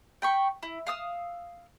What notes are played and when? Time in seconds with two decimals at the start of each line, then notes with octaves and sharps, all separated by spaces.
0.22 G5 B5 C#6
0.63 E4
0.87 F5 D#6 E6